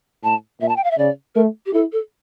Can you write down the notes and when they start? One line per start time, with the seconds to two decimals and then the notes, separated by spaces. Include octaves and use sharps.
0.23 A2 A5
0.60 A#2 E5
0.69 A5
0.76 G5
0.84 F5
0.91 E5
0.98 C#3 D5
1.35 A3 A#4
1.66 G4
1.73 E4 A4
1.92 A4